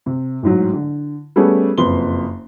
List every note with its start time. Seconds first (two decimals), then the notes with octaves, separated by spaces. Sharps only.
0.06 C3
0.43 A1 G#2 F#3
0.73 D3
1.36 G3 A3 B3 C#4 G#4 A4
1.78 F#1 F2 B4 C6 G7